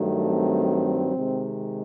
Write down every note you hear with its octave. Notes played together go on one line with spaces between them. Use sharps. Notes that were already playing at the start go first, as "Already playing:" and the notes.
Already playing: G2 D#3 F#3 A3
C4
C3 D#3 G#3